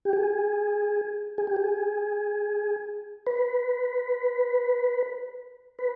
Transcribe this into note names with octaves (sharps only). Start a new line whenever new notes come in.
G4
G#4
G#4
G4
G#4
B4
B4